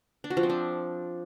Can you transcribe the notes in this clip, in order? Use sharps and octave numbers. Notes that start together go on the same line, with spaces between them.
D4
F#4
F3
C4
D4